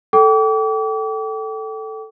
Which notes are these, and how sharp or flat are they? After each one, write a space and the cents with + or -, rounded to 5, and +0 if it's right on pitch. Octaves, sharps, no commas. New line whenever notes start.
A4 +0 G5 -25 D6 -40